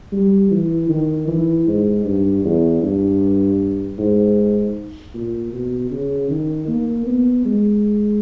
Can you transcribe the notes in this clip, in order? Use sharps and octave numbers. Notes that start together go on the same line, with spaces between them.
G3
E3
D#3
E3
G#2
G2
E2
G2
G#2
A#2
B2
C#3
D#3
A#3
B3
G#3